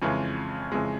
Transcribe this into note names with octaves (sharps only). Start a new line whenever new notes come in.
F2 C#3 E3 G#3
F2 C#3 E3 G#3